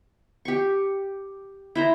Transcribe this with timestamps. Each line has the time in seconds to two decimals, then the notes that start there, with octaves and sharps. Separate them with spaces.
0.45 G4 C#6
1.75 E4 C5 A#5